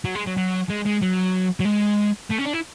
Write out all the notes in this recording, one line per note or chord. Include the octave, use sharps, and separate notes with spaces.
F#3
G#3
F#3
F#3
G#3
G#3
F#3
F#3
G#3
A3
C#4
D4
E4